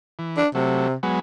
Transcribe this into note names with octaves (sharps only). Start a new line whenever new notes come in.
E3
D4
C3 F#3 A3
F#3 G#3 B3